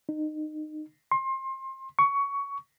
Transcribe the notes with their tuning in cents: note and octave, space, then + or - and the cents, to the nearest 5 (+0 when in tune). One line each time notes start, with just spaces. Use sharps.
D#4 -25
C6 +30
C#6 +15